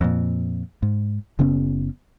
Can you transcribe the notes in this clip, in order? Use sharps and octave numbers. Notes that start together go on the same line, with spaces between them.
F2 A#2
G#2
F#1 C#3 B3 C#4